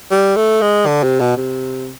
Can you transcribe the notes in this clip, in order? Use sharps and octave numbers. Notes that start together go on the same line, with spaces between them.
G3
A3
G#3
D3
C3
B2
C3